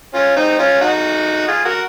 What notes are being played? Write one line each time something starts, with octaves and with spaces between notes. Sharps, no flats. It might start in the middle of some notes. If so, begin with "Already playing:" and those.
C#4 F4
C4 D#4
C#4 F4
D#4 F#4
F4 G#4
F#4 A#4